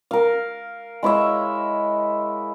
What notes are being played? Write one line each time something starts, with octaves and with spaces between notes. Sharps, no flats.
A#4 F5
G#3 E4 C#5 E5